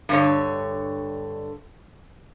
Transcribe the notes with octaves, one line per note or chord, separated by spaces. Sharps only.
G2 D3 C#5